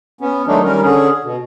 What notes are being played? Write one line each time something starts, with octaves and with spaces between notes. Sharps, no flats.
B3 C#4
D#3 F#3 G#3 A3 D4 D#4
D#3 G3 C#4 A#4
D3 C#4 G#4
B2